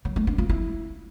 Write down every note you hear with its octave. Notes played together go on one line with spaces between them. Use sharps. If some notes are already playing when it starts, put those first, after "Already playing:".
F#3
A3
D4
F4
E4